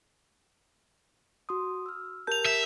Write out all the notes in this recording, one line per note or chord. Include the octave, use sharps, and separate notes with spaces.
F#4 C6 D#6
E6 F6
G4 A#4 A5 G6 F7
E5